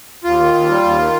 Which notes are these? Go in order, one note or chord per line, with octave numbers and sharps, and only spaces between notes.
D#2 F4
D#3
D#2
G3
D#2
D#3